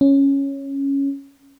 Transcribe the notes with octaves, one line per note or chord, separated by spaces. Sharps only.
C#4